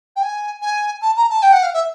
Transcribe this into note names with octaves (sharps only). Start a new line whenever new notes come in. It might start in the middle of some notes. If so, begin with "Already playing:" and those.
G5
G#5
G#5
A5
A#5
A5
G5
F#5
F5
E5